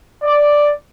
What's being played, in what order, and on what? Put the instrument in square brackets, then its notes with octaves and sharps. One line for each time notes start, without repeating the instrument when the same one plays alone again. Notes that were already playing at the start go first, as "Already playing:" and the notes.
[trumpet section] D5